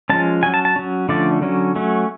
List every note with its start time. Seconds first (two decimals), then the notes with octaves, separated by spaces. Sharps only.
0.10 F3 G#3 C#4 A5
0.43 F#3 C#4 G#5
0.54 A5
0.65 A5
0.76 F#3 C#4
1.09 D3 F3 A3 C#4 D5
1.42 D3 F#3 C#4
1.76 F#3 A3 C#4